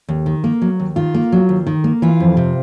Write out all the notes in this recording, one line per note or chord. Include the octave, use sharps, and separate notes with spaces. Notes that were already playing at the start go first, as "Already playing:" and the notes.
D#2
D#3
A#3
F#3
D#2
D#3 F4
A#3
F#3
D#2
D#3
A#3
E3 F4
F2
C3